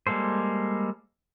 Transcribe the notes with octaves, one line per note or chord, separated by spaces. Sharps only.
G3 G#3 A#3 A4 C5